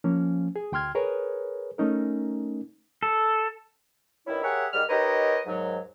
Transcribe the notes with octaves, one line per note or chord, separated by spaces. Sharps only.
F3 A#3 C#4
G#4
D2 G5 C6 F6 G#6
G#4 A#4 B4 C#5
A3 C#4 D#4 A#4
A4
G2 D#3 C#4 E4
G4 G#4 A#4 C#5 E5 F#5
G#2 D#3 G3 F6
D#4 G4 A#4 B4 C#5 D#5
D#2 G#2 F#3